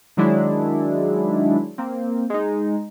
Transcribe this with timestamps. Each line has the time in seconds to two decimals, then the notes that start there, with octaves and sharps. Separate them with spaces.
0.17 D#3 F#3 G#3 D4 E4
1.78 A#3 C4
2.30 G#3 D#4